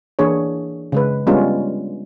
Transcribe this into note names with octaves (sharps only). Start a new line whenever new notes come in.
E3 A#3 D4 G#4 C#5
C#3 G#3 B4
G3 G#3 B3 C#4 D4 F4